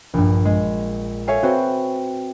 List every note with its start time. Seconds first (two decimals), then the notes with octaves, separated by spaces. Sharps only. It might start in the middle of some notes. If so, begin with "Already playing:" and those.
0.14 A#1 G2
0.45 G#3
1.27 A4 C#5 E5 F5 G#5
1.43 C4 F#4 B4 C5